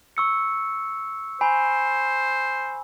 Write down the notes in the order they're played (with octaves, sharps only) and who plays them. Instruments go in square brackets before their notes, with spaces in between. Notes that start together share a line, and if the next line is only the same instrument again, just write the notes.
[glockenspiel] C#6 E6 C#7
[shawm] C5 [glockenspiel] G#5 B5